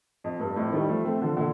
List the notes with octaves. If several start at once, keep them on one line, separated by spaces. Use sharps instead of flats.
F2
G2
F2 A2
D#3 G3
F3 A3
A3 C4
D3 F3
A#2 D3